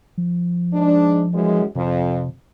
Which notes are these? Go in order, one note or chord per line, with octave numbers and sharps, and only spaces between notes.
F3
G#2 G#3 D4
F#2 E3 G#3
F2 C3